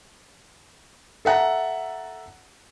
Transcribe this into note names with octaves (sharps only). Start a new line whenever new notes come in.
A4 E5 F#5 A5 A#5